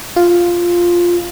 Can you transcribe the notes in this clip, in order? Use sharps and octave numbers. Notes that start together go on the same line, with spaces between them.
F4